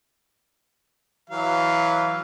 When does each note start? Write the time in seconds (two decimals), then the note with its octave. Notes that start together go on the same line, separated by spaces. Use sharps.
1.30 E3 F#3 F5